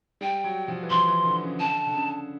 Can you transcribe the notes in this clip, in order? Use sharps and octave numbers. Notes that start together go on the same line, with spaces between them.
G3 G5
F#3
F3
E3
F3 C6
E3
D3
C#3
D3 A5
D3
C#3